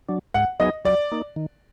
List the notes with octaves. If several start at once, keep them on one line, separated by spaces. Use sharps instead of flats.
F#3 D4
G#2 F#5
F#3 B3 D#4 G#4 D#5
F#3 D5
A#3 D#4
D#3